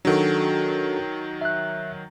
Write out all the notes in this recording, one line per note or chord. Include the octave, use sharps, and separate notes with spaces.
D#3 F#3 D4 F#4 A4
E5 F#6